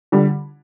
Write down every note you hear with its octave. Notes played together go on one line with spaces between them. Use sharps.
D3 G3